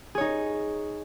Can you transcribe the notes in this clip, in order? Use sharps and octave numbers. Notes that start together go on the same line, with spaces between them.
D#4 G#4 C#5